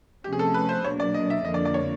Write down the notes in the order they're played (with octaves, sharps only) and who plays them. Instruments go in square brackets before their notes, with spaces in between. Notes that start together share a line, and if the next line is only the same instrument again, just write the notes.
[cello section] C3 F3 A3 C#4 [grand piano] G4
[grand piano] G#4
A4
B4
C5
[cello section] B2 F#3 A#3 D4 [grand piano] C#5
[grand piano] D5
D#5
E5
[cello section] F2 D3 F3 A#3 D4 [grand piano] D#5
[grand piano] D5
D5
C#5